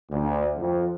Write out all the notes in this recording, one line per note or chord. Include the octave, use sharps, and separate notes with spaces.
D2
F2